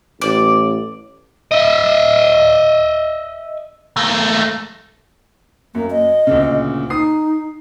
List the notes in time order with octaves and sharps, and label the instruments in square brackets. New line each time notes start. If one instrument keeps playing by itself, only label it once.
[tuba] A1 [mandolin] D5
[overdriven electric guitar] D#5 E5
[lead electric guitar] A3 A#3
[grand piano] F#2 [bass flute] A#3
[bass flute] D#5
[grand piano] D2 A#2 C#3
[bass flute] D#4 [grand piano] D#6 C7